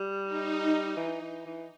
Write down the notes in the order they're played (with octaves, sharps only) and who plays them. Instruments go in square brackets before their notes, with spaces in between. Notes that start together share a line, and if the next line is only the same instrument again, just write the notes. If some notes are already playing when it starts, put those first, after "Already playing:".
Already playing: [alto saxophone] G3
[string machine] D#4
[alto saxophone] E3
E3
E3